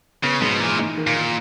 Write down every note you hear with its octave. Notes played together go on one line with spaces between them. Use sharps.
C#3 B3
G#2 B2
A#2 E3
D#4
D#3
A#2
D#3